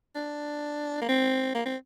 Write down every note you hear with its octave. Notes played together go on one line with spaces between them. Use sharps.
D4
A#3
C4
A#3
C4